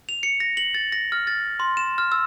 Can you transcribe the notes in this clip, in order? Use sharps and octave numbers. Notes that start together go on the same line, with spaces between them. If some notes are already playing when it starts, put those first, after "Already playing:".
F7
C#7
A#6
F#7
A6
A#6
F6
A6
C6
E7
F6
E6